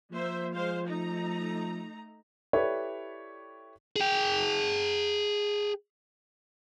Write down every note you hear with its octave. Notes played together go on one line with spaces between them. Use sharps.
F3 A#3 C5 E5
G#3 C5 F5
A3 D#4 A#5
E4 G4 A4 B4 C#5 D5
G#4 G5